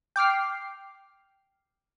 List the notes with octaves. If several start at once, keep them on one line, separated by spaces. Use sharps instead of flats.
G5 D6 F6 C7